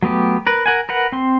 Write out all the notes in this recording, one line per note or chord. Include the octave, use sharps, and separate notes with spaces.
F#3 A3 B3 G4
A#4 B4
A#4 F#5 G#5
A#4 B4 F#5
C4 C6